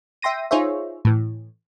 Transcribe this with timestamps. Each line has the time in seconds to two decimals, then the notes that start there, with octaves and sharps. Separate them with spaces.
0.22 E5 G5 C6 A#6 D#7
0.51 D#4 F4 G#4 C5 C#5 E5
1.05 A2 E3